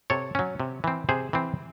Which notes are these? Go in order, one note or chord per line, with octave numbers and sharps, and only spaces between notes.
C3 A4 C#5
F#3 C#4
C3
E3 C4
C3 G#4 C5
E3 C4